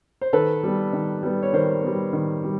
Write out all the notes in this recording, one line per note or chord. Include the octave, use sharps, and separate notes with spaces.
C5
D#3 A4 B4
G3 B3
D#3
G3 B3
C#5
D#3 A#4 C5
G3 B3
D#3
G3